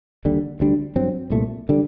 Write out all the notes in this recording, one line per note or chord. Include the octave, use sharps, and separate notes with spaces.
D#2 D3 G3
D2 D3 G3 D4
G2 F#3 C4
C2 A#2 A3
D3 G3